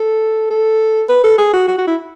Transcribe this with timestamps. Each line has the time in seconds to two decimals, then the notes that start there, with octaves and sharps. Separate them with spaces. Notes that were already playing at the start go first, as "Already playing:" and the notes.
Already playing: A4
0.51 A4
1.09 B4
1.24 A4
1.38 G#4
1.53 F#4
1.68 F#4
1.78 F#4
1.87 E4